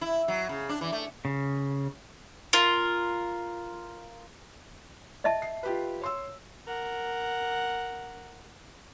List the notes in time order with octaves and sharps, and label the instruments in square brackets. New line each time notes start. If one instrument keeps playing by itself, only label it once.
[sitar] E4
F#3
C#3
D4
E3
A3
[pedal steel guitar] C#3
[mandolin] F4 A#4
[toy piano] D#5 E5 A5
[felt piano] C7
F4 G4 B4
C#5 C6 E6
[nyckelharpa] A#4 F#5